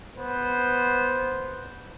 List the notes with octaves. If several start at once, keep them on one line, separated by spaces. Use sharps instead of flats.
B3 C5